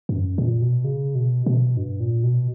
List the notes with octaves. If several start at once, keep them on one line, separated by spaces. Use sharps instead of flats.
G2
F#2
A#2
B2
C#3
B2
B2
G2
A#2
B2